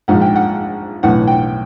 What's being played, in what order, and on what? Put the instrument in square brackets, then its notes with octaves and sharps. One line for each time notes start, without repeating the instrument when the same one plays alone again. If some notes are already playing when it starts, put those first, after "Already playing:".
[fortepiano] A#1 G#2 F3 F#5
G5
F#5
B1 A2 E3 F#5
G5